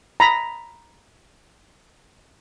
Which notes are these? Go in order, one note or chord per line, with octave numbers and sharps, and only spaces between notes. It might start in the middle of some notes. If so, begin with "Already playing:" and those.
A#5 B5